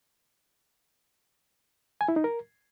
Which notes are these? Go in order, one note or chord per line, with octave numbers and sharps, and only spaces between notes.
G#5
E4
D#4
A#4